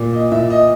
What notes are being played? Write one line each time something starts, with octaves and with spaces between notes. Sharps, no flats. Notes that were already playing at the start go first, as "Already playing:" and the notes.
Already playing: A#2
D#5
A#2 E5
D#5